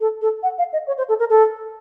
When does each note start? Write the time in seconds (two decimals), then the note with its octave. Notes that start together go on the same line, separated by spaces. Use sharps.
0.01 A4
0.22 A4
0.43 F#5
0.58 F5
0.73 D#5
0.87 C#5
0.98 C5
1.09 A4
1.19 A#4
1.30 A4